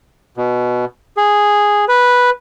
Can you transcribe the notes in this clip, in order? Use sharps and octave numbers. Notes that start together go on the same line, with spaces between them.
B2
G#4
B4